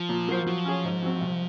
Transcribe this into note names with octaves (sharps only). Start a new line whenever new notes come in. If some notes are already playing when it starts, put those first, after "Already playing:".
Already playing: F3
A#2
F#3 A#3 F4 C5
F3 F#3
C#4 G#4 C#5
G#2
F#3 C4
C2